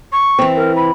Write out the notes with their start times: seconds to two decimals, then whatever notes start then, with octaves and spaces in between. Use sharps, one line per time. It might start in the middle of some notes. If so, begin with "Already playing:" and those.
0.12 C#6
0.39 E3 C4
0.56 A#4
0.76 B5